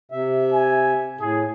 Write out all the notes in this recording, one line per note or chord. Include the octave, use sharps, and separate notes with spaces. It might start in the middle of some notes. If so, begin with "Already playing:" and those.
C3 E5
G#5
A2 G#4